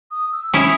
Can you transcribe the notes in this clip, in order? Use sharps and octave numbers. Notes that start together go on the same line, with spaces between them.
D#6
E6
C#4 E4 D#6